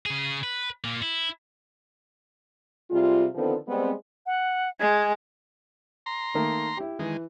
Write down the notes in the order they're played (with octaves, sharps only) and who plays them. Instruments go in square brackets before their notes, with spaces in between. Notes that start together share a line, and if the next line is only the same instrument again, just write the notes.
[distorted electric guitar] C#3 G#4
B4
A#2 A#3
E4
[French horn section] C3 G3 G#3 F4
D3 D#3 F3 B3 C4 A4
G3 G#3 B3 C4
[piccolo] F#5
[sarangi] G#3 [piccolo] G#6
[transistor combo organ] A#5 C6
[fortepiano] D#3 A3 A#3
E4 G4
[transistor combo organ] D#3 G#3 [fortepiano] E3